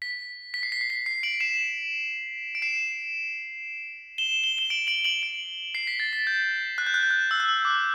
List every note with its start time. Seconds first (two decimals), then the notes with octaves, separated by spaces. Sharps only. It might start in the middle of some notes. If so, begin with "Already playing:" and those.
0.02 B6
0.54 B6
0.63 C7
0.72 B6
0.81 C7
0.90 B6
1.06 C7
1.23 D7 F#7
1.40 C7 E7
2.55 D7
2.62 C7 E7
4.18 E7 G7
4.44 G7
4.58 E7 G7
4.70 D7 F#7
4.87 D7 F#7
5.04 D7 F#7
5.22 D7 F#7
5.75 C7
5.87 B6
6.00 A6
6.13 B6
6.27 G6
6.78 F#6
6.87 G6
6.94 F#6
7.03 G6
7.11 F#6
7.31 E6
7.40 F#6
7.48 E6
7.65 D6